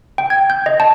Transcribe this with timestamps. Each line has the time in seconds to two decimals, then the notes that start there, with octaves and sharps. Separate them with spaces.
0.18 G5
0.30 G#6
0.50 G6
0.66 D#5
0.80 A5